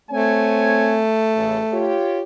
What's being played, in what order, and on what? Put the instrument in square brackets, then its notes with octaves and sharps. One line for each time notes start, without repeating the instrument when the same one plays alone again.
[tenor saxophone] A3 [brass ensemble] C4 C#5 G#5
[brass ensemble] A1 C#3 A4
F4 G4 C#5